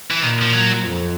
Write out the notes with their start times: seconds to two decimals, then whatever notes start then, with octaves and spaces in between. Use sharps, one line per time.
0.10 E3
0.22 A#2 D#3
0.42 F3
0.53 F#3
0.82 F2